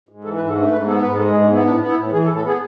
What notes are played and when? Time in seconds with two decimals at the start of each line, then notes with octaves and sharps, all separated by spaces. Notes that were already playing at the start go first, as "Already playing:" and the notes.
0.09 G#2
0.24 E3 A4
0.36 B4
0.40 G#2
0.49 A4
0.56 A3 D4
0.71 G#2 B4
0.86 B3 A4
1.02 G#2 B4
1.18 G#3 A4
1.30 G#4
1.33 G#2
1.41 D4
1.50 B3 E4
1.65 A2 D4
1.80 B3
1.88 E4
1.96 A2
2.12 E3 G#4
2.24 A4
2.28 A2
2.36 A4
2.43 B3 G#4